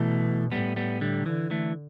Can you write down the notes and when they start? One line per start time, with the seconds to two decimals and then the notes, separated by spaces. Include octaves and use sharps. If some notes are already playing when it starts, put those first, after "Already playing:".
Already playing: B2 E3 A3
0.52 A2 G3 B3
0.76 G3 B3
1.01 D3 G3
1.26 D3 E3
1.51 E3 A3